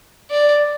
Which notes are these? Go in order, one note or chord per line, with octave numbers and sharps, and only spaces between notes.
D5